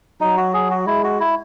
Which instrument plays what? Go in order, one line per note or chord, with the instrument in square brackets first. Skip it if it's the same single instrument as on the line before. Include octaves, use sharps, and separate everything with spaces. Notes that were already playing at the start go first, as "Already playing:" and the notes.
[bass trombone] F#3 [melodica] D#4
[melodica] F#4
G#4
F#4
[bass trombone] G#3 [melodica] E4
[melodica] F#4
E4